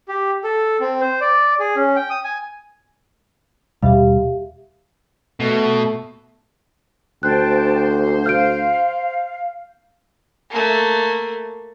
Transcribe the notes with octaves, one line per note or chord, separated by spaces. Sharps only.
G4
A4
C4
C5
D5
G#4
C#4
G5
D#6
G#5
D#2 B2 G3 G4 E5 F5
B2 A3
D2 C5 G5 A5 F#6
F5 F6 G6 D7
A3 A#3